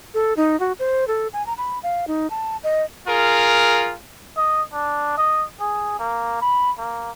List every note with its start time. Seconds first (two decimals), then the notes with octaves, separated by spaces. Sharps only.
0.14 A4
0.37 D#4
0.60 F#4
0.79 C5
1.08 A4
1.33 G#5
1.46 A#5
1.58 B5
1.83 F5
2.08 D#4
2.30 A5
2.64 D#5
3.08 F4 G#4 A#4
4.37 D#5
4.73 D4
5.17 D#5
5.60 G#4
5.99 A#3
6.41 B5
6.78 A#3